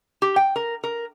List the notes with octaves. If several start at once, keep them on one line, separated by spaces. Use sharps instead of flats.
G4
G5
A#4
A#4